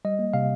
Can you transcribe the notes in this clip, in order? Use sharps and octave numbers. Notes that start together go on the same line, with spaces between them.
G3 D#5
A#3
C3 F5